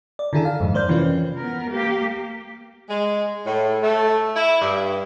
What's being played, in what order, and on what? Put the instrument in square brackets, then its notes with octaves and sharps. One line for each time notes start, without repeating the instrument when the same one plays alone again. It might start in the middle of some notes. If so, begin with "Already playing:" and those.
[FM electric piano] D5
D3 D#3 E4 G#4 A4
F5
F2 G#2
A#3 C5 D5 G6
C3 E3 A#3 C#4 F4 B4
[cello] B3 A#4
A#3 G4
[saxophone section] G#3
A2
A3
E4
G2